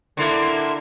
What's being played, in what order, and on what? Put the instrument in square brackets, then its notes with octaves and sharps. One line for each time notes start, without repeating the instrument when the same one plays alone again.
[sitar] D3 A#3 E4